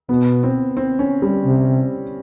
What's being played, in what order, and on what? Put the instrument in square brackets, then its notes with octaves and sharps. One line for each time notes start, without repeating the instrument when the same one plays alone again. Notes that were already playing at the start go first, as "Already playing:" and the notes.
[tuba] B2 [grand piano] B3
[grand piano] C4
C4
C#4
G3
[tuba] C3